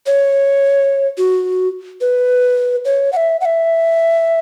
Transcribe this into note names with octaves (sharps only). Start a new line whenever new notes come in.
C#5
F#4
B4
C#5
F#5
E5
F#5
E5